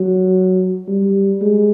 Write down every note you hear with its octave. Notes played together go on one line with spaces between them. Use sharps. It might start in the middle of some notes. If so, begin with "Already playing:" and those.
Already playing: F#3
G3
G#3